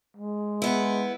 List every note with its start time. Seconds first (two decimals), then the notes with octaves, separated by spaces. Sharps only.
0.17 G#3
0.62 B3 E4